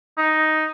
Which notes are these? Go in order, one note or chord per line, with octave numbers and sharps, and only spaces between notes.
D#4